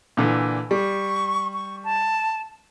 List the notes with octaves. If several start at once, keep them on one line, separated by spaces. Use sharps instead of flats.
A#2 D3 E3
G3 C#6
C#6
A5